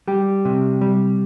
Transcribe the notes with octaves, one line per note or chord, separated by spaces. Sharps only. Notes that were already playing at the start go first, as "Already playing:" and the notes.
G3 G4
C3
G3